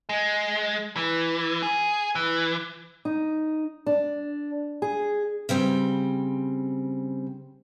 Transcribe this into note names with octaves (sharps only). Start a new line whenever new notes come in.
G#3
E3
G#4
E3
D#4
D4
G#4
C#3 G3 C4